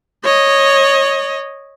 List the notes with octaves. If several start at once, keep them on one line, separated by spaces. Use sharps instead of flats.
C#5 D#5